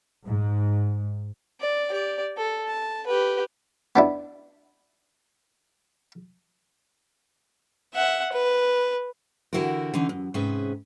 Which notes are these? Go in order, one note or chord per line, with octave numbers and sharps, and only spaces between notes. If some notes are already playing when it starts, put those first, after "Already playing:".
G#2
D5
G4 D5
A4
A5
G4 B4
B3 D4 E4
E5 F#5
B4
D3 E3 E4 F#4 G4 A#4
D3 E3 C#4 D#4
F#2
G#2 C3 C#4 G#4 B4 E5